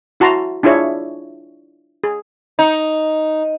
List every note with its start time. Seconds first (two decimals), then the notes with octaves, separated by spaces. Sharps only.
0.20 E4 F#4 A5 A#5 C6
0.63 D4 E4 F4 G#4 C#5 E5
2.04 G#4
2.59 D#4